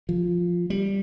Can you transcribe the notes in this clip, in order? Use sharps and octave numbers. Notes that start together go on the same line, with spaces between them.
F3
G3